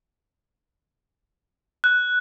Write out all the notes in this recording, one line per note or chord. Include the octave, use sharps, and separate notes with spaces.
F#6